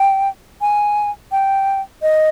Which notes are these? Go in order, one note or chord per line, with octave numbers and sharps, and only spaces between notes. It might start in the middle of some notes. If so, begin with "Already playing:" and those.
Already playing: G5
G#5
G5
D#5